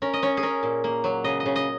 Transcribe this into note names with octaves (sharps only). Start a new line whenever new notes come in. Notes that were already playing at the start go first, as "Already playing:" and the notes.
C#4 A#4
D#5
C#4 C#5
G#4
C#4 A#4
A#2
A#3
F#3
C#3 D#5
D#5
C#3
D#5